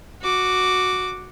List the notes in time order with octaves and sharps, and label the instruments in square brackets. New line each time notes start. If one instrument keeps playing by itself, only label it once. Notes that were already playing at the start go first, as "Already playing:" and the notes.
[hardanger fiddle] F#4 D6